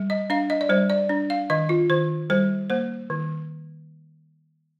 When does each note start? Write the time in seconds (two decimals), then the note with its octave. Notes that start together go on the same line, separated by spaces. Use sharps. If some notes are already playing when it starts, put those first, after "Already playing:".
Already playing: G3
0.10 D#5
0.30 D4 F5
0.50 D#5
0.61 D5
0.69 G3 C5
0.90 D5
1.09 D4
1.30 F5
1.50 D#3 D#5
1.69 F4
1.90 D#3 C5
2.30 G3 C5
2.70 A#3 C5
3.10 D#3